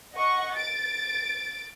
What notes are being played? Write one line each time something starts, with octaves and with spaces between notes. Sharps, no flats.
D#5 F#5 C#6
A6 D7